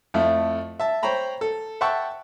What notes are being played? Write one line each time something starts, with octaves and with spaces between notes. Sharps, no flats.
F2 A3 E4
E5 A5
C5 C#5 G5 A#5 B5
A4
E5 F#5 G5 A5 C#6 E6